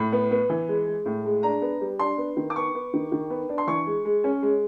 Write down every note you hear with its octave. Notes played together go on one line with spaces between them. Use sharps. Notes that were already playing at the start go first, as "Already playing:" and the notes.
Already playing: A2 B5
B3
B3
E3
G#3
G#3
A2
G#3
D4 A#5
B3
G3
D4 C6
B3
D#3
D6
B3 C#6
B3
D#3
D#3
B3
D4
C6
E3 C#6
G#3
G#3
C#4
G#3